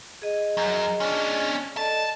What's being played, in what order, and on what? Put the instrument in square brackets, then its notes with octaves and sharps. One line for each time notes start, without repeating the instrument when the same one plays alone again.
[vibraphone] G#4 D#5
[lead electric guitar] F#2
C#4 D4
[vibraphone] A4 D5 D#5 [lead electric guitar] A5